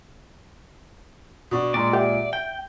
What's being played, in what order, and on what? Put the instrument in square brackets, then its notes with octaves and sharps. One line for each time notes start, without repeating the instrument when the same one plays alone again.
[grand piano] B2 D4 [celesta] F#5 C#6 D#6
[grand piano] A#2 G#3 [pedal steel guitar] D5 [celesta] G5 A#5 C6
[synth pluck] G4 [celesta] E5 F#5
[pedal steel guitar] G5 [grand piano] G6